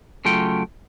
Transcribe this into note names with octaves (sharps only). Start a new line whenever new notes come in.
C#3 F#3 A3 F4 G5